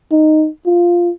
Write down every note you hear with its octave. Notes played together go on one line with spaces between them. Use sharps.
D#4
F4